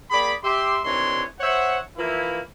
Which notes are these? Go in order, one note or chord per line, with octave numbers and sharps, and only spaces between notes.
A#3 G#4 D5 G5 B5
G4 E5 C6
C3 D#3 E3 D4 C#5 C6
C5 C#5 E5 F#5
E3 F3 A#3 E4